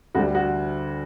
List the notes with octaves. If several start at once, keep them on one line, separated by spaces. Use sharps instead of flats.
D2 D3 G3 F#4
F#4